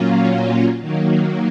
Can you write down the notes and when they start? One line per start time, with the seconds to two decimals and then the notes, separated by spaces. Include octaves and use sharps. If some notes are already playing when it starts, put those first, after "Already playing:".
Already playing: A#2 F#3 A#3 C#4 F4
0.81 D#3 F#3 A#3